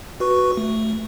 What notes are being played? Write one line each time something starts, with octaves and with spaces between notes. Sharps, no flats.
F#4 B4 C#6
A3